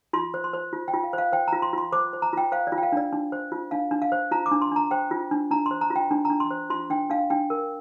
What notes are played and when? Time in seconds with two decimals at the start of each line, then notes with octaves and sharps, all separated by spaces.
0.13 F4 C6
0.34 C5
0.44 C6
0.53 C5
0.73 F4
0.88 G5
0.94 F4
1.04 F5
1.13 C5
1.18 F5
1.32 C5 G5
1.48 F4 A#5
1.62 C6
1.73 F4 C6
1.92 C5 D6
2.13 C5
2.22 A#5
2.33 F4 G5
2.52 C5 F5
2.67 D5
2.72 F4
2.78 G5
2.83 F5
2.92 D4 D5
3.13 D4
3.32 C5
3.52 F4
3.71 D4 F5
3.91 D4
4.02 F5
4.12 C5
4.31 F4 A#5
4.46 D6
4.51 D4
4.62 C6
4.71 D4 A#5
4.91 C5 G5
5.11 F4
5.31 D4
5.51 D4 A#5
5.66 C6
5.71 C5
5.81 A#5
5.90 F4
5.96 G5
6.11 D4
6.25 A#5
6.30 D4
6.40 C6
6.51 C5
6.70 F4 C6
6.90 D4 G5
7.10 D4 F5
7.30 D4 G5
7.50 A#4